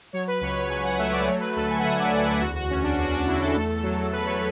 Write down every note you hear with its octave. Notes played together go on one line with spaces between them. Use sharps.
F#3 C#5
B4
C#2 C#5
C#5
C#2 G#5
F#5
A3 E5
D5
F#3 C#5
B4
D2 A4
G#5
F#5
D3 E5
D5
D2 D5
E5
E2 F#4
F#4
E2 C#4
D4
E2 F#4
D4
E2 E4
A4
A3
F#3
F#3 B4
C#5